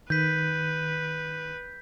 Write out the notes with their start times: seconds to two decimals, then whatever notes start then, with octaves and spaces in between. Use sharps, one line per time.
0.10 D#3 B4 G6 B6